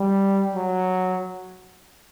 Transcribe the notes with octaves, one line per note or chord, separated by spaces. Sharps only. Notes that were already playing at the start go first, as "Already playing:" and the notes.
Already playing: G3
F#3